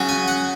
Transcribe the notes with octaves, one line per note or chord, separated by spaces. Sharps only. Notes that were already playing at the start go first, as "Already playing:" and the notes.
Already playing: C#3 F#3 C#4
G#5
F#5